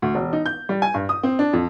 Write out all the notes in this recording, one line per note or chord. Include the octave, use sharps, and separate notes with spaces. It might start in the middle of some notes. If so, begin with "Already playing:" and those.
D2
E1
D#4
G6
G3
G#5
G2
D#6
C4
D4
F2